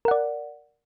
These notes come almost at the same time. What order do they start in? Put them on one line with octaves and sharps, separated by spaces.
A#4 F#5 D5